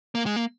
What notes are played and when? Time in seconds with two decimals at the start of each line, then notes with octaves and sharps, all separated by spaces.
0.15 A#3
0.26 G#3
0.36 A#3